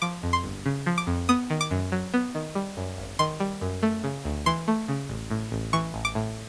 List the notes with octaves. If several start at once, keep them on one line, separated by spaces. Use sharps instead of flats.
F3 D6
F2
C6
G1
C#3
F3
D6
F2
B3 D#6
D#3
D6
F#2
F#3
B3
D#3
G3
F#2
G#1
D#3 C6
G3
F#2
A3
C#3
D2
E3 C6
A3
C#3
A1
A2
A1
E3 C#6
A1
D6
A2